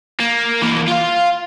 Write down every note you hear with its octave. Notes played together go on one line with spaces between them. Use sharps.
A#3
E3 A#3
F4 F5